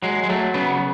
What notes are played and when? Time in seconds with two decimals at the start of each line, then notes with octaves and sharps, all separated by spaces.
0.02 F#3 G#3
0.23 G#3
0.29 F#3 A3
0.54 C#3 B3